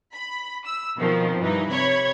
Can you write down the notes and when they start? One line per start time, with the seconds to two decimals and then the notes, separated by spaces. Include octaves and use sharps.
0.14 B5
0.65 E6
0.98 B2 D#3 F3 C4
1.40 G2 E3 D#4
1.70 C3 C#5 B5 G#6